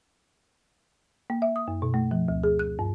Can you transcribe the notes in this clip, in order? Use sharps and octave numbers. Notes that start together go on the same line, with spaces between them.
A#3
E5
D#6
F#2
B2
A3
F3
D2
G#4
F#6
G2